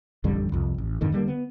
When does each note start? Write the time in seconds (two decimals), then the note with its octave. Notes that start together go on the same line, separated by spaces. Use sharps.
0.24 A1 F2 D3 G3
0.52 C2 F2
0.78 A1
1.01 F2 G#2 D3 D#3
1.12 D3 G3 G#3 A#3
1.28 B3